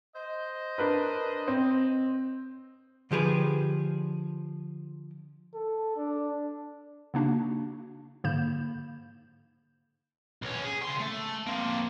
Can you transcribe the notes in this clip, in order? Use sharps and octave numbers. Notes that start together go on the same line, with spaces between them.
C5 D#5
D4 A#4 B4
C4
D3 F3 G4 G#4 B4
A4
D4
C#3 A#3 D4 D#4 F#4
G#2 D3 A#3 B5 G6 E7
B1 C#4
G#4
C#3 C6
A3
A#3 C4